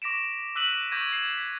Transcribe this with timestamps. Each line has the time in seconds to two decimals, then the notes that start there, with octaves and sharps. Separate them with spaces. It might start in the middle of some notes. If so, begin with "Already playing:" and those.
0.02 C#6 D6 A#6 B6 D7 E7
0.55 D6 E6 F#6 B6 D#7 F#7
0.91 C#6 D6 G6 G#6 A#6 D#7
1.13 G#6 C7 E7
1.37 G#6 B6